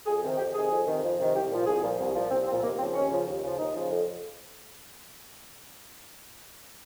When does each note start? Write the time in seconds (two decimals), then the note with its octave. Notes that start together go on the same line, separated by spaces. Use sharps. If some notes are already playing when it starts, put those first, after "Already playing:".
0.06 F2 G#4
0.23 C3 D#3
0.38 F2 G4
0.54 C3 D#3 G#4
0.70 F2
0.87 C3 D#3
1.03 F2
1.18 C3 D#3
1.35 C2 G4
1.50 A#2 F3
1.66 C2 G#4
1.82 A#2 F3
1.99 C2
2.15 A#2 F3
2.31 C2 C4
2.47 F3 C4
2.51 A#2
2.63 D#2 A#3
2.78 C#3 F3 C4
2.95 D#2 C#4
3.11 C#3 F3
3.26 D#2
3.43 C#3 F3
3.59 D#2 D#4
3.75 C#3 F3
3.91 F2